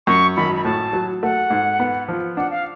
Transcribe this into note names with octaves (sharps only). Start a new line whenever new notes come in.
F#2 C#6
G#1 B5
B5
A2 A5
F#3
A3 F#5
G#2
B3
F3
D4 F#5
F5